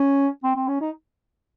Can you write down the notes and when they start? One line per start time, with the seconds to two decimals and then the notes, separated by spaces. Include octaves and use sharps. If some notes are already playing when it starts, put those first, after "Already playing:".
Already playing: C#4
0.43 C4
0.56 C4
0.68 C#4
0.81 D#4